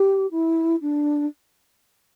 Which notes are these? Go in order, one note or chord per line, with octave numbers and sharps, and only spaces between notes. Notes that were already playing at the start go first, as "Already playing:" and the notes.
Already playing: G4
E4
D4